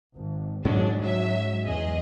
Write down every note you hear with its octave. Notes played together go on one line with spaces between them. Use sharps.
G#1
G#2 F#3 G#3 C#4 D4
F#3 E5
E2 G#4 D#5